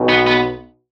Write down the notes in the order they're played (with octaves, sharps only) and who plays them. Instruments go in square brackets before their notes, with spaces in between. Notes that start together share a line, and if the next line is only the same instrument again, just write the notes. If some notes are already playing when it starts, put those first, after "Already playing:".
Already playing: [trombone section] B1 B2
[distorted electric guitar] B3
B3